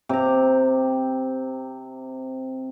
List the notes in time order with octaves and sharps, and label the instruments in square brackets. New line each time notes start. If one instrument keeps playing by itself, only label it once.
[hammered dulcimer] C3 A#5